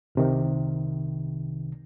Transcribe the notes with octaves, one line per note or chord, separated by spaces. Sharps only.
C2 C3 D#3